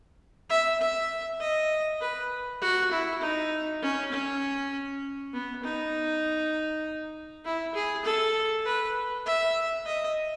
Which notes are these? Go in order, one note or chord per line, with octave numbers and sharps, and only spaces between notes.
E5
E5
D#5
B4
F#4
E4
D#4
C#4
C#4
B3
D#4
E4
G#4
A4
B4
E5
D#5